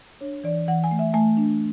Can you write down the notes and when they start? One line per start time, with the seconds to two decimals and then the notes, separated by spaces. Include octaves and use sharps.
0.21 D4 C#5
0.44 E3 D5
0.68 E3 F#5
0.84 G#5
0.91 A3
0.99 E5
1.14 A3 G#5
1.37 D4